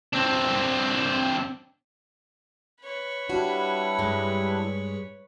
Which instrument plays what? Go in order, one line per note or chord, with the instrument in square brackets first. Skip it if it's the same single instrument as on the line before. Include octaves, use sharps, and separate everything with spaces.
[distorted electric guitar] C4 D4
[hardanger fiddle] B4 C#5
[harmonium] G3 D4 E4 [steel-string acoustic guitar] F#4
[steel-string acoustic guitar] G2 G#3